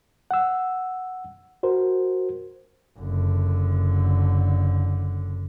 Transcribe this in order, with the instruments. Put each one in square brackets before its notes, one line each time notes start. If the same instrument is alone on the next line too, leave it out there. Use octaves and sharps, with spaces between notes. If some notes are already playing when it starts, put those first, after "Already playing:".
[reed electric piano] F#5 E6
F#4 A#4 C5
[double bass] F#1 D3